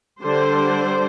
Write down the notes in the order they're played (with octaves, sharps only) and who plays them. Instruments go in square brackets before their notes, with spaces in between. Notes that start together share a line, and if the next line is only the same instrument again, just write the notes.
[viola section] D3 G3 D4 C5